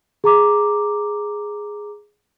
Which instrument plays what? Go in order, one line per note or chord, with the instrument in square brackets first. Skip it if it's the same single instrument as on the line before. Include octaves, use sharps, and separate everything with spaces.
[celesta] G#4 A#5 D6